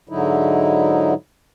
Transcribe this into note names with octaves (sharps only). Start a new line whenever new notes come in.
G#2 D3 F#3 D#4 E4